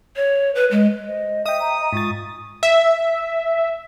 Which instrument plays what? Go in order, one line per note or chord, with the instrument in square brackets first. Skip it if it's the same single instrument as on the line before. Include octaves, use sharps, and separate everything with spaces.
[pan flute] C#5
B4
G#3
[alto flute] C5 [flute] D#5
[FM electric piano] D#5 G5 [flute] E5 [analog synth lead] D#6
[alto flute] A#5
[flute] D#5 [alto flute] A#5
[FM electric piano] G#2 A6 [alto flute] F4 [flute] C#6
[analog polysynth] E5